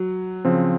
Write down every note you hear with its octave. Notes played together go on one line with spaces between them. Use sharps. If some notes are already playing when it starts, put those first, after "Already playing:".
Already playing: F#3
C#3 F3 C4